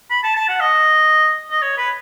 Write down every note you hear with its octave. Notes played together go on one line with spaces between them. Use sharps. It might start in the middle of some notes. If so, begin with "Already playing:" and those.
B5
A5
A5
F#5
D#5
D#5
C#5
B4